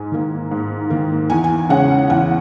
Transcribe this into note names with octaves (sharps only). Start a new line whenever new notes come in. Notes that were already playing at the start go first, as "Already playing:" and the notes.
Already playing: G#2 G#5
D#3 A#3
G#2
D#3 A#3
E2 G#5
G#5
C#3 G#3 C#4 F#5
E2 F#5